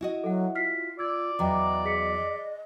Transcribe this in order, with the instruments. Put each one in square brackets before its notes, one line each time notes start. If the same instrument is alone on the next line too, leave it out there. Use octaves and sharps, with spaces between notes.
[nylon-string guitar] E4 F#4 D#5
[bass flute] F#3 [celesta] A4 F#5
[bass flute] F4 [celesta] F6 B6 C7
[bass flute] F4 [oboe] D5 [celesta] E6 G#6
[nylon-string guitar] E2 F#3 [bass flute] D#5 [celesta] G5 A#5 D6
[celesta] G#4 B6 C#7